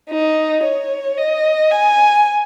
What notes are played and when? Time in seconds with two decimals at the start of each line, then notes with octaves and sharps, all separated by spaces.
0.10 D#4
0.64 C#5
1.17 D#5
1.71 G#5